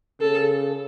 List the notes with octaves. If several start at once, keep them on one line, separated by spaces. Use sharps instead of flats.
C#3 A4